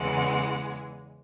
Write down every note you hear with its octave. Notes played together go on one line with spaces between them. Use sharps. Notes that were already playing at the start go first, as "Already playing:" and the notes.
Already playing: E2 C#3 E3 G#3 F#5